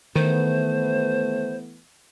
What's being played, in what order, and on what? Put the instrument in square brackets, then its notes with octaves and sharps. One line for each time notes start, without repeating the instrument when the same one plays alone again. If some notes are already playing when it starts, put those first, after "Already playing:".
[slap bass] D#3 [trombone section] E3 A3 B3 [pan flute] C5